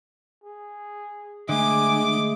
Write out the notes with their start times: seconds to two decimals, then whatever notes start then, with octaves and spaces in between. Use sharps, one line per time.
0.44 G#4
1.49 D3 G#3 A3 G#4 G#5 D6